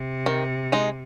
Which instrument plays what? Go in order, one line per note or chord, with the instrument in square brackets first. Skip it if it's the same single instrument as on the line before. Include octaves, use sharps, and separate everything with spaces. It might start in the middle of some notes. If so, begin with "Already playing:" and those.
Already playing: [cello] C3
[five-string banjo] D#3
G#3 D#4